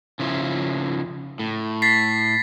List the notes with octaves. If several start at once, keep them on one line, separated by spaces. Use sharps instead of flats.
C#3 F3 E4
A2
A6 B6 C7